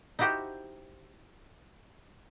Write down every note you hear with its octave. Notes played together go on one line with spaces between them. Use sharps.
D#4 E4 F#4 G4 C5